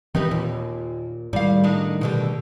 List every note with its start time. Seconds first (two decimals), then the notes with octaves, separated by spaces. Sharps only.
0.15 D#3 E3 C4 D#4 G4 B4
0.31 D#2 A#2
1.33 A2 D#3 G3 F5
1.64 D4 D#4
2.01 B2 D3 G3